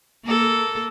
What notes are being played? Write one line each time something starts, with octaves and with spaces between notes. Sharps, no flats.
A#3 A4